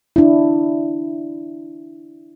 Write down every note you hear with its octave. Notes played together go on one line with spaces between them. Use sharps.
D4 E4